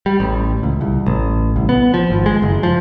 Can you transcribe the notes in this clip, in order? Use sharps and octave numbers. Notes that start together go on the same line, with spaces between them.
G3
A1
C#2
C2
A1
C2
B3
F3
G#1
G#3
F#1
F3